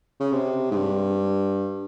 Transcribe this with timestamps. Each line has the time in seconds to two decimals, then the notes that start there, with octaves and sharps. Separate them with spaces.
0.20 C#3
0.32 C3
0.71 G#2
0.75 G2